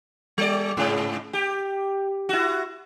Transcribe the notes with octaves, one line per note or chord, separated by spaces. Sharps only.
G3 D5
G#2 C#3
G4
E4 F#4